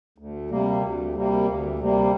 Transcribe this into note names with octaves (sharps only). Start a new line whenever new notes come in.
D2
C3 G3 A#3
D2
C3 G3 A#3
D2
C3 G3 A#3